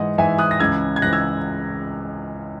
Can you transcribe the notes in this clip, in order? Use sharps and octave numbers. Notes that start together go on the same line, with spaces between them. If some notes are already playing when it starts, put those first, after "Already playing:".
Already playing: G#2 E3 D#5 F#5
G#2 E3 E5 G#5
D#6 F#6
A#6
C#2 C#3 E3 E6 G#6
G#6
C#2 C#3 E3 F#6 A#6
E6 G#6